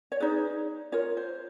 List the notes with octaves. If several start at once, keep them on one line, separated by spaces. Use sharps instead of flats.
C#5
D#4 G#4 B4 D5
F4 A#4 C#5
C5